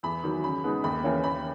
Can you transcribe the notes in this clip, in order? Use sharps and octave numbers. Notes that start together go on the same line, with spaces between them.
E2 B5
D#3 F#3
C#3 B5
G#3 B3 D#4
D#2 B5
C#3 E3 A#3 C#4
D#2 B5